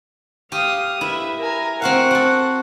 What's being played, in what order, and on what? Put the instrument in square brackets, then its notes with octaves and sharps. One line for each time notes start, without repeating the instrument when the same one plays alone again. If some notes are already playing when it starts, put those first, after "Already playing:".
[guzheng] G4 [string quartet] F5 D#6
[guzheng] E4 [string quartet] B4 E5
[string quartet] A#4 G#5 A#5
[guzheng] C4 F#4 F5 [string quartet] F#5
[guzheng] F#4 A4